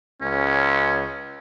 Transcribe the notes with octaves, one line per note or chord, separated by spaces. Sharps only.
C#2 C#4